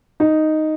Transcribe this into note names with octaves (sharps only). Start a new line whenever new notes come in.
D#4